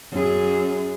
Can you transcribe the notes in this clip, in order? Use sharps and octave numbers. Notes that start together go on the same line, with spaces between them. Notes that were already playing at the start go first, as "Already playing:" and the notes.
F#2 G#4